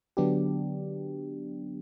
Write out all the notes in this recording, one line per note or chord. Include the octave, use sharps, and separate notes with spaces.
D3 F#3 B3 D4 G4